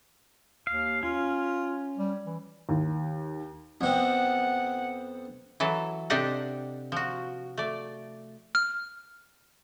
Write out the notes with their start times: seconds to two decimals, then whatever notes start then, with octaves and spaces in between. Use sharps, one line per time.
0.67 D#2 F5
1.03 C#4 F4
1.97 G3
2.26 E3
2.69 D#2
3.81 F2 B3 C4 F#5
5.60 E3 F#3 A4
6.10 C3 D4 G4 A4 D#5 F#5
6.92 F3 F#4
7.57 A3 D5
8.55 F6